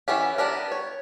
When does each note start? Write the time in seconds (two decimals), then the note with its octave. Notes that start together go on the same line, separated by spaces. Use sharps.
0.08 E3 B3 C#4 G4
0.38 B3 D4 G4 A#4
0.72 C#5